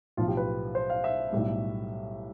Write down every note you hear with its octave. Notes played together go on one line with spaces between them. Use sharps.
B1 A2 F3 F4
G4
B4
C5
F5
E5
B1 A2 G3